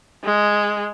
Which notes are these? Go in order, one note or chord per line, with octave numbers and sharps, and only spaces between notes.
G#3